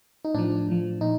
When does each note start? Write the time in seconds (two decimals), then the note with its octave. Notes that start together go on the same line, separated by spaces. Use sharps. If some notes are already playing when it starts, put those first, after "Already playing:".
0.25 D#4
0.34 A2 F3 D4
0.68 A2 F3
1.01 A#2 D#4